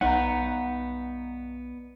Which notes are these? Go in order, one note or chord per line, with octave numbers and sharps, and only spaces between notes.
B1 G2 B3 D#4 F#5 A#5